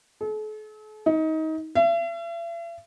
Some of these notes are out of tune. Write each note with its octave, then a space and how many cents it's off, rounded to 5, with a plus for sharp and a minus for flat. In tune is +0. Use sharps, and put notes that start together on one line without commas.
A4 -45
D#4 +25
E5 +45